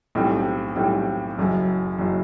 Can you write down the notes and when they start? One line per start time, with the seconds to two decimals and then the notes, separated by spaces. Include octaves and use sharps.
0.15 B1 A2 G3 C4
0.75 B1 A2 G3 C4
1.38 F#1 F#2 F#3
1.98 F#1 F#3